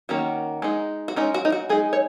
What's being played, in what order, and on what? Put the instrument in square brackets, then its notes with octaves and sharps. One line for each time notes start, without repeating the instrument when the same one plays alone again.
[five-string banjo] D#3 A#3 C#4 F#4
G#3 D#4
F#4
G#3 C#4 D#4
F#4
D#4
F#4
G#3 D#4 G#4
C#5